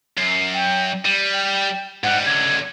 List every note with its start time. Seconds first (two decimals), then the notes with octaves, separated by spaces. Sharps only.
0.17 F#2 C7
0.54 G5
1.05 G3 D#7
1.33 G5
2.04 G#2 G3 F#5
2.26 C#2 D3 G#6